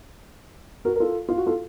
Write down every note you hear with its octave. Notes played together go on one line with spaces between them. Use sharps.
F#4 A#4
A#4
F4 A4
F4
F#4
F4 A4